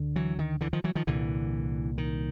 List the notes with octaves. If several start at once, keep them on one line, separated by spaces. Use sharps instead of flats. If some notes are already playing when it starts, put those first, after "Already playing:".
Already playing: D2 D3
E3 F#3
D#3
D3 E3
D#3 F3
E3 F#3
D#3 F3
C2 A#2 D3 E3
D#3